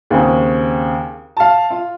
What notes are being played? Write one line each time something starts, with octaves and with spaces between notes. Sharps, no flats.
D#2 C#3 C4 G#4
F5 A5
F4